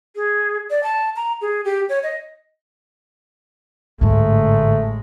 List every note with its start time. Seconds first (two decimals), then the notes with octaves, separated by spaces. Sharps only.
0.16 G#4
0.70 D5
0.83 A5
1.16 A#5
1.42 G#4
1.65 G4
1.89 C#5
2.03 D#5
4.01 A1 G#2 D3 G#3 A3